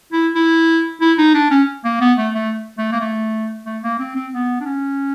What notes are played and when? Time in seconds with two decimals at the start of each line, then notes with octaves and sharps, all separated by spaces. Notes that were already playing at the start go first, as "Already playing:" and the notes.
0.13 E4
0.35 E4
1.01 E4
1.18 D#4
1.35 D4
1.51 C#4
1.85 A#3
2.01 B3
2.18 A3
2.35 A3
2.78 A3
2.93 A#3
3.01 A3
3.66 A3
3.83 A#3
3.99 C4
4.16 C4
4.34 B3
4.61 D4
4.66 C#4